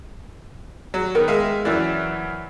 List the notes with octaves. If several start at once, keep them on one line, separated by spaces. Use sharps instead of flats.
F#3
D#3 B3 A#4 G5
G#3 E5 F5
F#2 E3 D5 E5